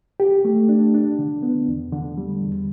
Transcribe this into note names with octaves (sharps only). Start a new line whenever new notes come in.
G4
A3
D4
D4
D3
B3
E2
D3
G3
E2